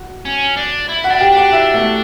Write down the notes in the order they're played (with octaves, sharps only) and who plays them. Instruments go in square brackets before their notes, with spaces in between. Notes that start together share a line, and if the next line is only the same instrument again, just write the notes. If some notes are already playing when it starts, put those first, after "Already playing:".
Already playing: [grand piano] F#4
[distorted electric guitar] C#4
D4
E4
[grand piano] F#4 F#5
[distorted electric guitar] D4
[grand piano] G4 G5
[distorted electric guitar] D4
[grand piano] F#4 F#5
E4 E5
A3 A4